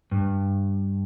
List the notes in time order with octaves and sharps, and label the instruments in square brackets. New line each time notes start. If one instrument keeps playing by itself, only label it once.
[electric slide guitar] G2